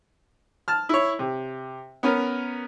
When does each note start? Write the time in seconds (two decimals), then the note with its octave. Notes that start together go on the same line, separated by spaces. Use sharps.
0.68 A5 F6
0.89 E4 C#5
1.19 C3
2.03 B3 C#4 A#4